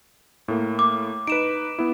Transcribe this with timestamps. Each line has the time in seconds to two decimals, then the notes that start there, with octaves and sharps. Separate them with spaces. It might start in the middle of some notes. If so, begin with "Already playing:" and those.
0.48 A2 A#3
0.79 D6
1.27 D#4 B4 D7 E7
1.79 B3 E4